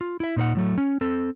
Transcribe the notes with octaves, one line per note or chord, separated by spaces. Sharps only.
F4
E4 E5
A#2 D#4 C5 F#5
A2 F#3 A3
C#4
C4 A4